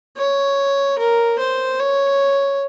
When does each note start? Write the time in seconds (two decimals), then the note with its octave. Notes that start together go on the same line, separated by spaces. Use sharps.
0.16 C#5
0.98 A#4
1.39 C5
1.79 C#5